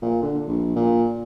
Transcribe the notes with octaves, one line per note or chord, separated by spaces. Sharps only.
A#2
D3
A#1
A#2